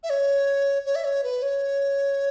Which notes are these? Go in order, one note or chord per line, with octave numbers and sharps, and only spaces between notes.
E5
C#5
C#5
E5
C#5
B4
C#5